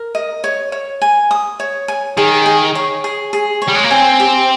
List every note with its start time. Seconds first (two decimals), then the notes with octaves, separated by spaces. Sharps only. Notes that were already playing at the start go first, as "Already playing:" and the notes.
Already playing: A#4
0.15 D#5
0.44 C#5
0.72 C#5
1.02 G#5
1.31 D#6
1.60 C#5
1.88 G#5
2.17 D#3 G#4
2.46 G#4
2.75 C#5
3.04 G#4
3.33 G#4
3.62 C#5
3.68 G3
3.74 G#3
3.83 A#3
3.90 C4 G#5
4.20 G4